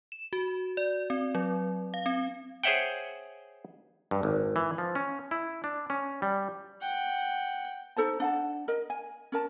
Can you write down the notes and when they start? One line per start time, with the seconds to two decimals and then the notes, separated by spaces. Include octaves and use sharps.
0.12 E7
0.33 F#4
0.77 D5
1.10 C4
1.35 F#3
1.94 F5
2.06 C4
2.64 G#4 C5 C#5 E5 F#5 G5
4.11 G2
4.23 G#1
4.56 E3
4.78 F3
4.95 C#4
5.31 E4
5.64 D4
5.90 C#4
6.22 G3
6.81 F#5 G5
7.97 D#4 A4 C5 A5
8.20 D4 F#5 A5
8.68 A#4 D#5
8.90 G#5
9.32 C#4 A#4 A5